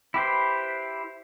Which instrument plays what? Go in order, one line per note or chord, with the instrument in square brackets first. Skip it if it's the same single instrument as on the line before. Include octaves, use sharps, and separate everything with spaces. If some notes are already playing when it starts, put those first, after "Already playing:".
[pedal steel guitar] E4 G4 B4 C5